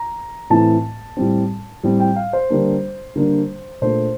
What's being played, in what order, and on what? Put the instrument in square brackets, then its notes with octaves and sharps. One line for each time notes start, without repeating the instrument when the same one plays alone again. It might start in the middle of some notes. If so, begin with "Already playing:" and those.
Already playing: [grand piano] A#5
A2 E3 A3 C4 A5
A2 G3 C4
A2 G3 C4
G5
F5
C5
D3 G3 A#3 D4
D3 G3 A#3 D4
A#2 A3 D4 C5